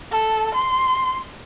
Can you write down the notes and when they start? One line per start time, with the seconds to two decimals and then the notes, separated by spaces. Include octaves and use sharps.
0.12 A4
0.55 C6